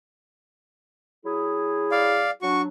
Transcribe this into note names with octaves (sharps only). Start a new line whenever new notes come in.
F#3 E4 G#4
D5 F5
F#3 D4 F#4 C#6